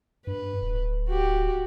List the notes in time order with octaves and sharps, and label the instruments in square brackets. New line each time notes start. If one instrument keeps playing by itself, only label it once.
[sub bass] G2 [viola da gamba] B4
[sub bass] D1
[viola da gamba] F#4 G4